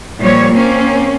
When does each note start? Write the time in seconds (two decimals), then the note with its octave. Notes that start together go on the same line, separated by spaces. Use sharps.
0.20 A#2 F3 G3 C#5
0.54 A#3 C4 C#4